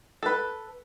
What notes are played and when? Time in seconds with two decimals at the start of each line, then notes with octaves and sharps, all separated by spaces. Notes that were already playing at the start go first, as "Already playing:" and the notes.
0.23 A4 B4